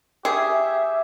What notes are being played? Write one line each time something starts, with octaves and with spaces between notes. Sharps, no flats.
G4 G#4 E5